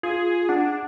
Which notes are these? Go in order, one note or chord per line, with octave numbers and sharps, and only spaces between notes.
F4 G#4
D4 F#5